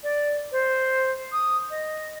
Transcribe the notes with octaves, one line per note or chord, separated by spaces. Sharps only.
D5
C5
D#6
D#5